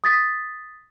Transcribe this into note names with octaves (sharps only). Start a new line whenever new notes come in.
D#6 A6 B6